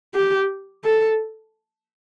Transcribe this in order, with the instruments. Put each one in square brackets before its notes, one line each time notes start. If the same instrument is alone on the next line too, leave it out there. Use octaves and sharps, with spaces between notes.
[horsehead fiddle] G4
A4